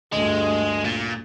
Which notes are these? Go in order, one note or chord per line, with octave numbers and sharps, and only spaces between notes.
D2 G2 G#3
A#2